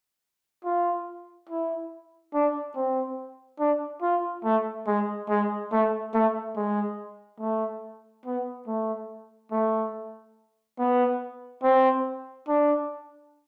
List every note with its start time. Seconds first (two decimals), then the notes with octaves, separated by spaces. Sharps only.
0.64 F4
1.49 E4
2.34 D4
2.76 C4
3.60 D4
4.02 F4
4.44 A3
4.87 G#3
5.29 G#3
5.72 A3
6.14 A3
6.56 G#3
7.40 A3
8.25 B3
8.67 A3
9.52 A3
10.79 B3
11.63 C4
12.48 D4